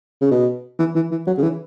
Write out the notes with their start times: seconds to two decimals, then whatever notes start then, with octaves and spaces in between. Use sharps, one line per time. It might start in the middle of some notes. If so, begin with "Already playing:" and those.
0.21 C#3
0.31 B2
0.79 E3
0.95 E3
1.11 E3
1.27 F#3
1.38 C#3
1.43 E3